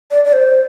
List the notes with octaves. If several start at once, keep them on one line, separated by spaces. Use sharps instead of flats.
D5
D5
C5